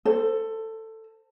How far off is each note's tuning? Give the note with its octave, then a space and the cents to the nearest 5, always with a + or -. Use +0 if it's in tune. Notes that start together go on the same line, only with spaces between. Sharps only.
A4 +15 C5 -5